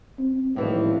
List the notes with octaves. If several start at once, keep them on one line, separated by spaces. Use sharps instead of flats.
C4
D#1 A2 E3 F3